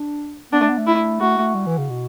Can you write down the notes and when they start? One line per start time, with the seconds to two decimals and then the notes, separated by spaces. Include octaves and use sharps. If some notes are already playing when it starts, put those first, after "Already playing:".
Already playing: D4
0.52 B3 D4
0.61 A3
0.69 B3
0.78 A3
0.87 E4
1.20 A3 F#4
1.38 A3
1.54 G3
1.66 E3
1.78 C#3
1.89 B2